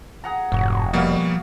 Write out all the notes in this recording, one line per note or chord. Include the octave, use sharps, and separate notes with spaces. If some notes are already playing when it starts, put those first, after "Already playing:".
G#4 F#5 A#5
F1 G#2 F#3 F#4
B2 F3 G3 A#3 F#4 F5